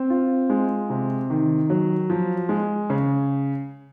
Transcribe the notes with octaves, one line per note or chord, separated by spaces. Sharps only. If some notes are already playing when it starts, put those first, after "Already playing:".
Already playing: C4
F4
G#3
C3
D#3
F#3
F3
G#3
C#3